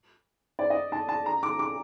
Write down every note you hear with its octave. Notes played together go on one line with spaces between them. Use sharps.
D5
D#5
A5
A5
A#5
D6
D6